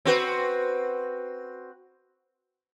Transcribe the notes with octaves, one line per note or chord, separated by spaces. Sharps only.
C4 F#4 B4